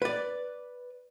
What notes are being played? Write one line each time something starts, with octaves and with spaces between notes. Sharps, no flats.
B4 D5